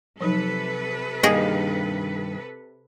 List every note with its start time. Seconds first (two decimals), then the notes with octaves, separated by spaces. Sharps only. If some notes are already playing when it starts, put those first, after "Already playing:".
0.21 C3 F3 F#3 D#4 A4 B4
1.23 G2 D#3 A#3 G#4 D#5